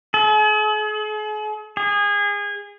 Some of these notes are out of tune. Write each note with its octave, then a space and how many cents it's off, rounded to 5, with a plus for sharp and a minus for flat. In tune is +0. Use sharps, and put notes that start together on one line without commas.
G#4 +45
G#4 -25